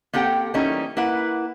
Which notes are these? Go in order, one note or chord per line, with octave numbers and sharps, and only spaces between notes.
A#3 C4 G4 A4 F#5 G5
E3 G3 A3 A#3 C#4 D#4
A#3 E4 B4 F#5